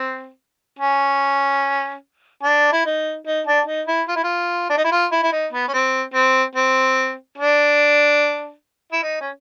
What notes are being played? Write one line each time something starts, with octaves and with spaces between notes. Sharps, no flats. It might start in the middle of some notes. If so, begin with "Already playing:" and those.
Already playing: C4
C#4
D4
E4
D#4
D#4
D4
D#4
E4
F4
E4
F4
D4
D#4
E4
F4
E4
E4
D#4
B3
C#4
C4
C4
C4
D4
E4
D#4
C#4